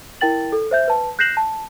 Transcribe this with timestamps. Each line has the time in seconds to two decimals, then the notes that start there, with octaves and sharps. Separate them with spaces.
0.21 E4 A#4 G5 A6 F#7
0.52 A4
0.71 C5 E5 G6
0.88 B4 A5
1.19 F#6 G6 A#6 C7 E7 F#7
1.37 A5